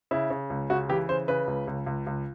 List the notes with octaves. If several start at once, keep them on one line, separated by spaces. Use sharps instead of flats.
C#3 E4
C#3
C#2
C#3 F#4
E3 G4
C#3 C5
C#3 B4
C#2
C#2
C#2
C#2